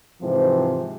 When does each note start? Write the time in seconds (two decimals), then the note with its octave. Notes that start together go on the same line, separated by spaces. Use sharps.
0.22 G#2 C3 E3 F3 C4